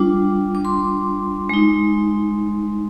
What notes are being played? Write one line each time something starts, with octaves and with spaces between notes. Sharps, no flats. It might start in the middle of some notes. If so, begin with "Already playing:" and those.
Already playing: G3 D4 F4 D6
D6
C6
G#3 D#4